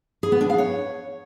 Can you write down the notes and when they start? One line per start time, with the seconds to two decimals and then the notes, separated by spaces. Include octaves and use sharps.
0.23 G#4
0.32 B3
0.41 D4
0.50 F5
0.58 C#5